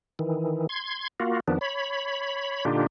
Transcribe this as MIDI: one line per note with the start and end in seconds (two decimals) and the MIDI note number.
0.19 0.67 51
0.19 0.67 52
0.69 1.08 84
0.69 1.08 92
1.20 1.40 58
1.20 1.40 65
1.20 1.40 66
1.48 1.59 41
1.48 1.59 51
1.48 1.59 53
1.48 1.59 59
1.48 1.59 62
1.61 2.65 73
1.61 2.65 83
2.65 2.87 46
2.65 2.87 50
2.65 2.87 62
2.65 2.87 63
2.65 2.87 65
2.65 2.87 67